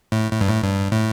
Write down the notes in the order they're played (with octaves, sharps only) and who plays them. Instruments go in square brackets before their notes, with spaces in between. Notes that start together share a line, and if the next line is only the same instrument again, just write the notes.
[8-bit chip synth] A2
A2
G2
A2
G2
A2